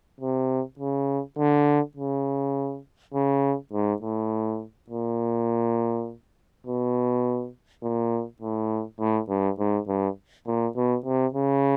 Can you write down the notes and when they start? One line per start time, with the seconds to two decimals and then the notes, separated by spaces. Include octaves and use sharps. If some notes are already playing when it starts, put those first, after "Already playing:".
0.21 C3
0.79 C#3
1.38 D3
1.97 C#3
3.14 C#3
3.73 G#2
4.02 A2
4.90 A#2
6.66 B2
7.83 A#2
8.42 A2
9.00 A2
9.29 G2
9.58 G#2
9.88 G2
10.47 A#2
10.76 B2
11.06 C3
11.34 C#3